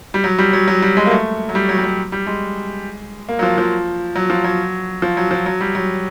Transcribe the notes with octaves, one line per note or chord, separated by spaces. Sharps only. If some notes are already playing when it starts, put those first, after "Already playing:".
G3
F#3
G3
F#3
F#3
G3
G#3
A#3
A3
F#3
G3
F#3
G3
F#3
G3
G#3
A#3
F#3
F3
F3
F#3
F3
F#3
F3
F#3
F3
F#3
G3
F#3